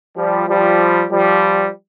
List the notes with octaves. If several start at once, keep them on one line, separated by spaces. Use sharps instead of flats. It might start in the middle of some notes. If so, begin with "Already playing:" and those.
F3 G3
F3 G3
F3 G3